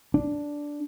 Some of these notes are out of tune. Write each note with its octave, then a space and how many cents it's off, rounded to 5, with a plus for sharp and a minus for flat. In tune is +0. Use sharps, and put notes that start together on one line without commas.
D4 -5